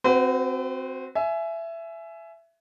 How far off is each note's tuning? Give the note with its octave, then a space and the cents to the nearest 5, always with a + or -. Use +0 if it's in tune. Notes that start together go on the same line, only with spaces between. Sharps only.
C4 +0 F#4 +0 B4 +45
E5 +15 G#5 +25